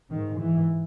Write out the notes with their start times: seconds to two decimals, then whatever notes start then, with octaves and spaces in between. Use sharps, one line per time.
0.10 G#2 D#3
0.39 E3